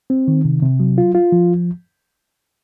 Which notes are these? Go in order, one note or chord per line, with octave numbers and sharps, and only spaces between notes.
C4
D#3
C3
C3
F#3
F4
F4
F3